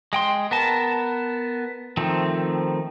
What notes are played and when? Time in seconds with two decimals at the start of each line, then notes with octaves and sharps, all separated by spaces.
0.13 G#3 G5 C6
0.51 B3 A#4 A5
1.97 D#3 F3 A3 C4